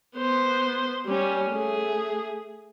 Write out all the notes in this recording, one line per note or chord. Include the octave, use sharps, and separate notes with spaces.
B3 C5
G3 C#4
A3 G#4